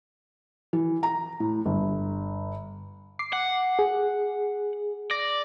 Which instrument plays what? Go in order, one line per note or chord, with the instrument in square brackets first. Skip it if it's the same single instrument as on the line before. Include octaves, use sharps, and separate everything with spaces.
[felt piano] E3
A#5
A2
G1
[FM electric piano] D6 C7
[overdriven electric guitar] F#5
[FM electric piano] G#4
[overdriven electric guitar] D5 [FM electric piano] A#6